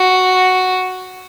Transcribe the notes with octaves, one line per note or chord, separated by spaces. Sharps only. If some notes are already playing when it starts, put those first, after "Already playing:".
Already playing: F#4